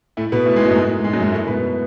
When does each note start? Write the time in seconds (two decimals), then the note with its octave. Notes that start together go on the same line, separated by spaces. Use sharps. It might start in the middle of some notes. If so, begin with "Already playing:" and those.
0.17 A2 A3
0.32 B2 B3
0.46 A2 A3
0.56 G#2 G#3
0.65 F#2 F#3
0.75 G#2 G#3
1.04 G#2 G#3
1.13 F#2 F#3
1.23 G#2 G#3
1.32 A2 A3
1.47 B2 B3